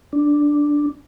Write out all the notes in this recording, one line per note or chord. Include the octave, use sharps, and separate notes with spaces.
D4